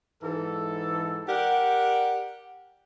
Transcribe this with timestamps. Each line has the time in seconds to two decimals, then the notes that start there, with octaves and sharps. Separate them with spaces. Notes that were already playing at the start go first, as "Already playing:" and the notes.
0.21 G#2 E3 A4
1.28 G4 A#4 D5 F#5